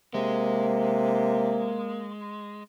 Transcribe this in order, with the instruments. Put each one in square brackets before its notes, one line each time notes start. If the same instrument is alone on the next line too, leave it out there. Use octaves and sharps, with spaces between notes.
[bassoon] C3 [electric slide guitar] G#3 [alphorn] A#3